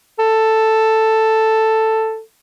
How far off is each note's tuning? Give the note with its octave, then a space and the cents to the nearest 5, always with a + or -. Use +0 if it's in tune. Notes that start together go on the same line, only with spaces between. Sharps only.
A4 +5